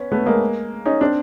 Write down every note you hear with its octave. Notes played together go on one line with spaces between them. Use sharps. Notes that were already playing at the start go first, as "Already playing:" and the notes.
Already playing: B3 C#4
A3 B3
G#3 A#3
C#4 D#4
C4 D4